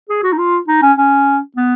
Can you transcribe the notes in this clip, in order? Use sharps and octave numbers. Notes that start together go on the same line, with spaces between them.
G#4
F#4
D#4
F4
D#4
C#4
C#4
B3